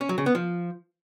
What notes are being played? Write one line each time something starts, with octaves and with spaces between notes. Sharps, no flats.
C#4
F#3
C#3
B3
F3